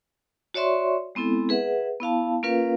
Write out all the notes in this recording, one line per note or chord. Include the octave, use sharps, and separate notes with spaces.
F#4 C#5 D5 E5 C6 C#6
G#3 B3 C4 E4 A4
G#4 B4 E5 F#5
B3 E4 F5 A5
A#3 C#4 F4 A#4 B4 F5